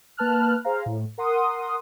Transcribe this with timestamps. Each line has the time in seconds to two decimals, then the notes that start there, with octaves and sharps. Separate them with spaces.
0.17 A#3 B4 A5 F6 F#6
0.64 G#4 C5 F5 A#5
0.86 A2
1.18 A#4 F#5 C6 D#6